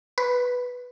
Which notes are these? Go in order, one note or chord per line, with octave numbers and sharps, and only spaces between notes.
B4